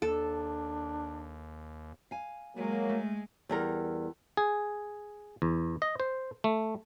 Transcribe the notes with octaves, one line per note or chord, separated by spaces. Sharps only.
D#2 D4 A4
F5 G#5
F#3 G#3 A#3
A3
E2 G3 A#4
G#4
E2
D#5
C5
A3